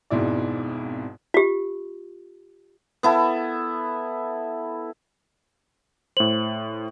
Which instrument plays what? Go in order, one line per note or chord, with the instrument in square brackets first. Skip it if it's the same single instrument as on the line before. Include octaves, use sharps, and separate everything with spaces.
[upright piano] G#1 F2 G#2 B2 E4 D5
[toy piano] F4 G4
[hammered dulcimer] B3 E4 A4
[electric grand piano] A2 C5 [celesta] F#7